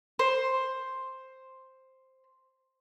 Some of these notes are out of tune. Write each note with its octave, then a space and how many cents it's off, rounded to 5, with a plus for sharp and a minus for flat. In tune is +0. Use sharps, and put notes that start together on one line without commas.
C5 +5